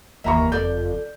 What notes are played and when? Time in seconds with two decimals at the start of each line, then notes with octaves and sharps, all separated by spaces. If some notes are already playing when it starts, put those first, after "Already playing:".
0.24 F#1 D#2 E3 A#3 E5 A#5 C#6
0.52 F2 A4 D5 G6